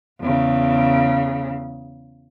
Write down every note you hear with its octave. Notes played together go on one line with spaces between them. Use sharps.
E2 C#3